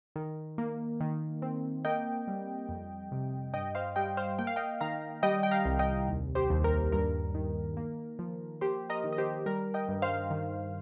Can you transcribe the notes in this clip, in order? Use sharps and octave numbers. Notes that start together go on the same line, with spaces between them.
D#3
A#3
D#3
C4
A#3 D#5 G5
G3
F2
C3
G2 D#5 G5
C5 F5
G3 D#5 G5
C5 F5
A#3 G5
F5
D#5 G5
D#3 F5 A#5
G3 D#5 G5
G5
F5 A#5
C2
D#5 G5
D#2
G4 C5
D#2
A#4
G2 A#4
D#3
A#3
F3
A#3 G4 C5
A#4 D#5
D#3
D#5
G4 C5
G3 A#4
D#5 G5
G2
C5 F5
D#3